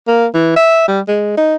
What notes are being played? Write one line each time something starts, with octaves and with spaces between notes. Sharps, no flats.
A#3
E3
E5
G3
G#3
D#4